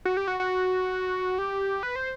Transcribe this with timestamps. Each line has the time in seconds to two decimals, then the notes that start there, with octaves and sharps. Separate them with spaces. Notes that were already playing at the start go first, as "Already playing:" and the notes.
0.05 F#4
0.17 G4
0.28 F#4
0.40 F#4
1.38 G4
1.83 B4
1.96 C5